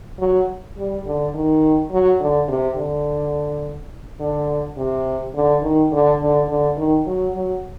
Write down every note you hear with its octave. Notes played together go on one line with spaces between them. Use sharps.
F#3
G3
D3
D#3
F#3
D3
C3
D3
D3
C3
D3
D#3
D3
D3
D3
D#3
F#3
F#3